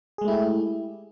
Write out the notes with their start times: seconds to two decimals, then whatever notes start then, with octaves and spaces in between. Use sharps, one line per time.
0.18 G#4
0.22 G#3
0.25 A3
0.28 E4
0.31 G4